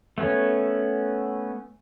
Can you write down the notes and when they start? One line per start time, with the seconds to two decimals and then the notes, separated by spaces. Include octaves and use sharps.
0.18 A3 B3 C#4